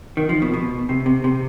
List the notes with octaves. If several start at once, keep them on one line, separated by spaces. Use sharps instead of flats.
D#3
F3
B2
B2
C3
C3
C3